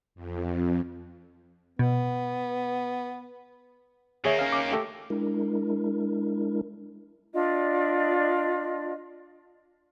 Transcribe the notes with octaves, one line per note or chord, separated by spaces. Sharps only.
F2
B2 B3
D#3 A#3 G#4 C#5 E5
C#4 F5
D6
A3 G4 A4
G#3 D4 E4 A#4
D4 F4 D5 D#5